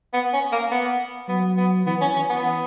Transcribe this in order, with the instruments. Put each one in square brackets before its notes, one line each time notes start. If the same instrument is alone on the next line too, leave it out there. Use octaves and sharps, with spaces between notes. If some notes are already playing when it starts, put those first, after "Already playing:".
[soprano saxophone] B3
C#4
A#3
B3
[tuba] F#3 [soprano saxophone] B3
[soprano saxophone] B3
[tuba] E3 [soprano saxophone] B3
[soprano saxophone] C#4
C#4
B3